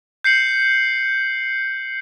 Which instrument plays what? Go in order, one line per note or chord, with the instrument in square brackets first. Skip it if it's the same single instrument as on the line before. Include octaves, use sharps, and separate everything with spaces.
[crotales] G6 C7 C#7 F#7